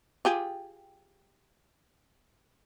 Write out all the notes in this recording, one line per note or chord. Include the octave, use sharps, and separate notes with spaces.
F4 G4 G#4